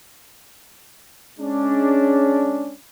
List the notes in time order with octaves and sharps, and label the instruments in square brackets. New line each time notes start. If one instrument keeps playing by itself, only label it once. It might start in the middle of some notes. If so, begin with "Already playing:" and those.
[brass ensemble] G#3 C#4 D4